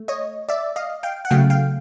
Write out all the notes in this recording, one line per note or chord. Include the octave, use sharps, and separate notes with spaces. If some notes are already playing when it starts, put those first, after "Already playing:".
Already playing: A3
C#5 D#5
D5 E5
D#5 F5
F5 G5
F#5
C#3 F#3 A3 F5 G5
F5 G5